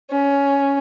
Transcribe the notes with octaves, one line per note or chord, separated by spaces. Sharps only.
C#4